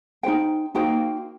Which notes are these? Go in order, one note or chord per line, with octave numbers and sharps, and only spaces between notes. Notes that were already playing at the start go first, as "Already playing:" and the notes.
D#4 F#4 C5 G5
A#3 D#4 F#4 C5 G5